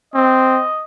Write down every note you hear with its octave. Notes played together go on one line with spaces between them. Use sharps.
C4 D#5